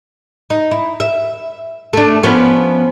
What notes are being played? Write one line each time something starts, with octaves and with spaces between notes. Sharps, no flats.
D#4
E4
E5
A3 D4
F3 B3 C#4